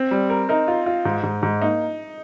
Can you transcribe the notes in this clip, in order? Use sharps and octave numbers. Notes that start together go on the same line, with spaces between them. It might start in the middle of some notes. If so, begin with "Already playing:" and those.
Already playing: C4
G3
A#4
D#4 A#4
F4
F4
G#2
G#2
G#2
A#3 D#4